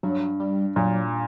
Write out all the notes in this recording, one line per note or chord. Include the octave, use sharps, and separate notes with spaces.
G2 F#3
G3
A#2 F#3